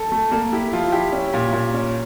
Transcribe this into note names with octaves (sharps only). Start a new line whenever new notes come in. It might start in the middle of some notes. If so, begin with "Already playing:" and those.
Already playing: A4
A3
A#3 A4
E4 G4
F3 F4
E4 G4
C#4
A#2
A#2
C#4